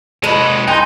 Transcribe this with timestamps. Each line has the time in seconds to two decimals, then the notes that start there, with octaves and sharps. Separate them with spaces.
0.24 G#3 A4 B4 D#5
0.68 D#4 G5 G#5 C6